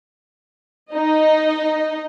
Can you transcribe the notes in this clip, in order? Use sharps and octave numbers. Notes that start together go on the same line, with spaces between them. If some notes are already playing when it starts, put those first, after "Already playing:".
D#4 D#5